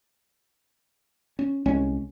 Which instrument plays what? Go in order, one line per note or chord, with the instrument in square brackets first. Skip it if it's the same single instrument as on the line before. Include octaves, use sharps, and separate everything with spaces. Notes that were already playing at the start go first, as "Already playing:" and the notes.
[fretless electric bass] C#4
C2 G#3 C#4